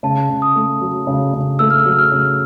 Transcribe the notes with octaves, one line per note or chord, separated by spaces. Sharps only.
C#3 A5
C#3
D#6
A3
F#3
C#3
C#3
A3 E6
F6
E6
F#3
F6
C#3